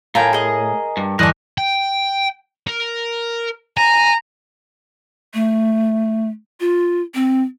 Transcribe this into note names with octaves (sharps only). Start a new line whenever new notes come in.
A2 F4 A4 A#4 G5 G#5 A#5
G#4 D#5
G2
G1 E2 A#4 D5 D#5 A5 F#6
G5
A#4
G#5 A#5
A3
F4
C4